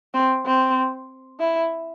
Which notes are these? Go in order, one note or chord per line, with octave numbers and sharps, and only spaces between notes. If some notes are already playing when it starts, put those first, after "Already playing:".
C4
C4
E4